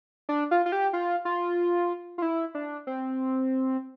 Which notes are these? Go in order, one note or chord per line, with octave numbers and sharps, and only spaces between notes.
D4
F4
F4
G4
F4
F4
F4
E4
D4
C4